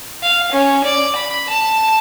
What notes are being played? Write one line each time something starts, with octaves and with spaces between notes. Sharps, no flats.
F5
C#4
D5
B5
A5